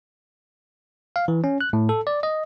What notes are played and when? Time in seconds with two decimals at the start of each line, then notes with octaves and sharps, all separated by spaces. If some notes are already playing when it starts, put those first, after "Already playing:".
1.16 F5
1.28 E3
1.44 C#4
1.61 F#6
1.73 A2
1.89 A4
2.07 D5
2.23 D#5